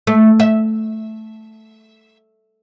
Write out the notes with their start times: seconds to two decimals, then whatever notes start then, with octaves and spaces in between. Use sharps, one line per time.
0.07 A3
0.40 E5